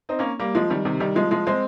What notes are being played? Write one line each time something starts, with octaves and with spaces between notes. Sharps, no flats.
C4 D#4
A#3 C#4
G3 A#3
F3 G#3
D#3 G3
C3 D#3
D#3 G3
F3 G#3
F3 G#3
G#3 C4